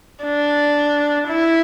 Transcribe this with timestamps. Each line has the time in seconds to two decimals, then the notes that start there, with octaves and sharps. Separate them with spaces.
0.24 D4
1.28 E4